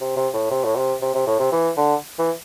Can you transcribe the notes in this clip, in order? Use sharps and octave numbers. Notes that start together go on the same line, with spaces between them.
C3
C3
A2
C3
A2
C3
C3
C3
A2
C3
E3
D3
E3